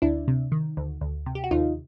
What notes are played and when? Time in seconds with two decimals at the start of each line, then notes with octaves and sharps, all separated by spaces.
0.02 D2 D4 E4
0.28 C3
0.52 D#3
0.77 D2
1.01 D2
1.26 C3
1.35 G4
1.44 F#4
1.51 D#2 D#4 F4